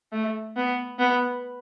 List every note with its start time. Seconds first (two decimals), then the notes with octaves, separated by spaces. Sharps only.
0.12 A3
0.56 B3
0.99 B3